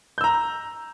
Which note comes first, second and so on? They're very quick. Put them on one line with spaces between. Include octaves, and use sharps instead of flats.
G6 E6 A#5